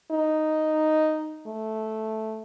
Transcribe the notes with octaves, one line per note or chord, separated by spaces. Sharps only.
D#4
A3